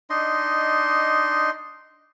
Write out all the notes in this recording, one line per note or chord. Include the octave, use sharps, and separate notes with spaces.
D4 D#4 D#5 C6